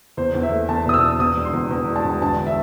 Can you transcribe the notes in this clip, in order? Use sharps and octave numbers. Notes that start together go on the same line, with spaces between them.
E2 C5
E2
E5
A3
E2 A5
B2 D#6
E6
E2
E2 D#6
E1
C6
E2
E2
E1
A5
E1
G1 A5
E5